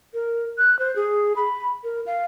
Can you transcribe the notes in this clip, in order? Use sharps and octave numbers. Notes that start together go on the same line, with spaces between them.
A#4
F#6
C5
G#4
B5
A#4
F5